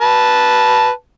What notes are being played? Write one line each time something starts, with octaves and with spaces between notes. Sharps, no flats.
B4 A5